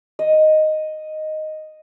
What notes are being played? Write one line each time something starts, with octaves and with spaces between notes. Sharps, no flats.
D#5